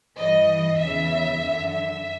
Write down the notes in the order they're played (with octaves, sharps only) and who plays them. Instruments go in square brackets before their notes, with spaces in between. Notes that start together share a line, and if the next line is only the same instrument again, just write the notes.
[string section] G2 E3 D#5
E2 C#3 E3 E5
F#2 D3
E5